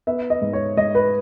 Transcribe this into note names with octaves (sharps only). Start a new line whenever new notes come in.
B3 E5
D#5
G#2
C#5
G#2 D#5
B4